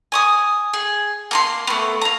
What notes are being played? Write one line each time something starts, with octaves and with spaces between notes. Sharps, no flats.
G#5 C#6 D#6
G#4
A#3 A#5 C6
A3 B3
F5 A#5